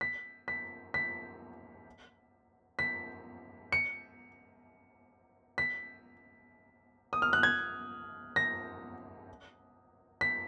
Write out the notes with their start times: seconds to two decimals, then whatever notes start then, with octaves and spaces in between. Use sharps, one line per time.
0.01 B6
0.48 B6
0.94 B6
2.79 B6
3.72 C#7
5.58 B6
7.13 D#6
7.22 F6
7.33 F#6
7.43 G#6
8.36 A#6
10.21 B6